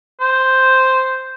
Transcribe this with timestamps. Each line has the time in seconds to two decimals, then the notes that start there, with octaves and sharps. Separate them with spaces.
0.21 C5